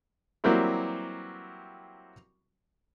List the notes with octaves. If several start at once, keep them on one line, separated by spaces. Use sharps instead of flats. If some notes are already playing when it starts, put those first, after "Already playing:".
E3 F#3 G3 A#3 C4 E4